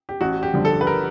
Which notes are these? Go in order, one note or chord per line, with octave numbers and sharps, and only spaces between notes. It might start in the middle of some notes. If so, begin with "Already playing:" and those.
G4
A1 F#4
G4
G2 D3 F3
A4
B4
A#4